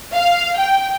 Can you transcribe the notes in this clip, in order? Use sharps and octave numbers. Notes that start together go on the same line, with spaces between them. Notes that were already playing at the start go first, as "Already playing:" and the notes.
F5
G5